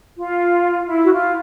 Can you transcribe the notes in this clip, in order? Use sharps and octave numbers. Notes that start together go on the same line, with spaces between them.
F4
E4
F#4
F4